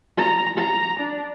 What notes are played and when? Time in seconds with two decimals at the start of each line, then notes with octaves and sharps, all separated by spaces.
0.18 A#5
0.58 A#5
1.00 D4